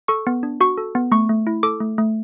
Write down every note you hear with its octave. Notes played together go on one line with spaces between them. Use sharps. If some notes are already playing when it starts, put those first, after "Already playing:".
A4 C#6
B3
D4
F#4 C#6
A4
B3
A3 C#6
A3
E4
A4 D6
A3
A3